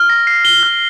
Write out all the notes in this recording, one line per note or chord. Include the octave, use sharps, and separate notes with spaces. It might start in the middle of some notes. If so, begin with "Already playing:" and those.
Already playing: F6
A#6
C7
G7
F6